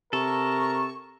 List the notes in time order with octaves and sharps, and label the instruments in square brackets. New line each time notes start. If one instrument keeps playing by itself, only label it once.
[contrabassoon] C3 [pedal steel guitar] A4 [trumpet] A#4 [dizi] C#6